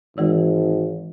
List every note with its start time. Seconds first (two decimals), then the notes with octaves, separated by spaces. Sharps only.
0.17 G#1 D#3 E3 G#3